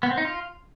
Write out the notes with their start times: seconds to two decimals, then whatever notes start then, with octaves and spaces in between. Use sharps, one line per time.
0.03 B3
0.10 C4
0.18 D#4
0.25 F4